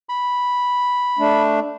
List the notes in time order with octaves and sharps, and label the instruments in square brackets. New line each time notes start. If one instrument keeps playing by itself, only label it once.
[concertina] B5
[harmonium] A3 D4